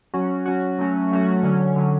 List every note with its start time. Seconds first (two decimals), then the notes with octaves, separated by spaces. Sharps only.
0.14 F#3 C#4 F#4
0.46 F#3 C#4 F#4
0.79 F#3 A3 C#4 F#4
1.11 F#3 A3 C#4 F#4
1.43 D3 F#3 C#4
1.76 D3 F#3 C#4